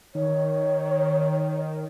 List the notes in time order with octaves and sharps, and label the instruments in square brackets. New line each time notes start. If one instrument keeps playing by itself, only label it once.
[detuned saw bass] D#3 [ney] C#5